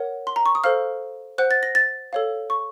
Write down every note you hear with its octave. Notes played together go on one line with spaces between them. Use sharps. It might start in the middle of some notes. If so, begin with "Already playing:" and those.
Already playing: A#4 C#5 F#5
C6
A#5
C#6
D#6
A4 C5 F5 F6
C5 F#5 F#6
A6
A#6
A6
A4 C#5 F5
C#6